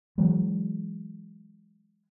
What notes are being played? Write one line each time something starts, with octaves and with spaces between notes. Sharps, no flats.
E3 F#3 G#3